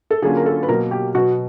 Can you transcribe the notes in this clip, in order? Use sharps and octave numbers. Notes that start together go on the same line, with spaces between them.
A4
D3 F#3 A#3 C#4 F4 G#4
A#4
A4
B4
B2 F#3 A#3 A#4
G4
B2 F#3 B3 F#4